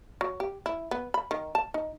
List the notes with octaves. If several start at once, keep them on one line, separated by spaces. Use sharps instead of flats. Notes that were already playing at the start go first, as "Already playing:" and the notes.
F#3
G4
E4
B3
B5
D#3
A5
D#4